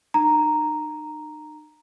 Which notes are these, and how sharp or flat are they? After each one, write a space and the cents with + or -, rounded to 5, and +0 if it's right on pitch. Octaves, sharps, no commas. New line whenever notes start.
D#4 -40 A#5 +0